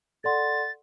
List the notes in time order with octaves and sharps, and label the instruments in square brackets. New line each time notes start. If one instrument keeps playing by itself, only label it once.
[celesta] A4 D5 F#5 C6 [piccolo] A6